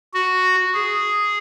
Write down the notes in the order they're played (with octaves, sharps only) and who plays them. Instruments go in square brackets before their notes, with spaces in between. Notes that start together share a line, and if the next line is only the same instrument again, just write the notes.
[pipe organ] F#4
G#4